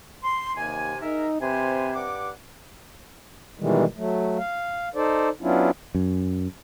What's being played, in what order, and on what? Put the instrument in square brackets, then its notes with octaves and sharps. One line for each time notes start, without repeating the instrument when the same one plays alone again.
[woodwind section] C6
[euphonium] D#2 [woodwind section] C3 G#5
[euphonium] D#4 [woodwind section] G#4 A#4 E5
[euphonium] C3 [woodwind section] B4 C5 G#5
[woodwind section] G2 F#5 D6
[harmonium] B2 D#3 E3 G3 G#3
F#3 A3
F5
D#4 A4 C5 D5
F#3 B3 C#4 D4 E4 F4
[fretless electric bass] F#2